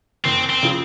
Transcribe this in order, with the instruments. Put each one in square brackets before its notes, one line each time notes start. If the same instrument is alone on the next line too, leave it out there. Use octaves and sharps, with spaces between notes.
[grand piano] F#1 [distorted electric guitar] C4
[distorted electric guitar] C4
[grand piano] C#3 F3